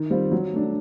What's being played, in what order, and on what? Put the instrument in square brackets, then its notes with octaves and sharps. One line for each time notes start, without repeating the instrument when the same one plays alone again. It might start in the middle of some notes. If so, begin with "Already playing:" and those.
Already playing: [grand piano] D#3
G3 C4 F4
F#3
A3 D4